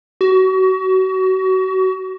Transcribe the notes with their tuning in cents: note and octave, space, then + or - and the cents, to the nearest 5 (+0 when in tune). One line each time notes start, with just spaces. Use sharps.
F#4 +30